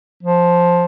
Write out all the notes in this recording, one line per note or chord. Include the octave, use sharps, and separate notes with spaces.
F3